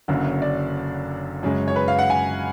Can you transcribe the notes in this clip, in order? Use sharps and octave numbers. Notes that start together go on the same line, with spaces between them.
F#1 F#2 D3
D5
F#2 C#3 G#3
C#5
B4
F5
F#5
G#5